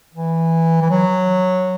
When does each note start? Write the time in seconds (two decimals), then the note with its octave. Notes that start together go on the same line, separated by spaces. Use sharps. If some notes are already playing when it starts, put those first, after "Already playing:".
0.14 E3
0.82 E3
0.90 F#3